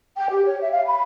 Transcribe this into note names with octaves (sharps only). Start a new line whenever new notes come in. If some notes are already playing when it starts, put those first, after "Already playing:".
G5
G4
C#5
E5
F5
B5